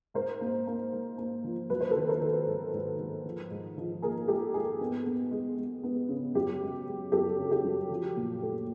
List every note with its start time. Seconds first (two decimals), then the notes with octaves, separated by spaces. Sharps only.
0.14 G#2 A#4 C5
0.41 A#3
0.67 A#3
0.93 G#2
1.18 A#3
1.44 F3
1.70 F#3 B4
1.81 C5
1.91 D#3 A4 B4
2.08 A#4 C5
2.22 D#3
2.47 G#2
2.73 G#2
2.99 G#2
3.25 F3
3.51 G#2
3.77 F3
4.02 A#3 G#4 A#4
4.28 G#2 G4 A4
4.54 G#2 G#4
4.80 B3
5.06 B3
5.31 G#3
5.57 G#3
5.83 B3
6.09 C#3
6.35 F#2 G4
6.61 G#3
6.87 G#3
7.12 F#2 G4 A4
7.38 C#3
7.51 G4
7.64 F#2
7.90 F3
8.16 A#2
8.42 A3